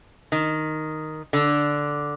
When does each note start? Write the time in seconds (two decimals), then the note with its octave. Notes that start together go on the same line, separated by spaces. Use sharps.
0.32 D#3
1.33 D3